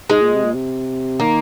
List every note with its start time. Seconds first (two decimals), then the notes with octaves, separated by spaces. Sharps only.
0.09 G#2 G#3
0.22 A#2
0.34 C3
0.44 A#2
0.54 C3
1.20 D#3 A#3